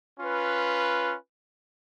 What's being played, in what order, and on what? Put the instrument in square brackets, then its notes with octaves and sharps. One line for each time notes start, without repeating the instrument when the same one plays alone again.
[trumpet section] C#4 F4 B4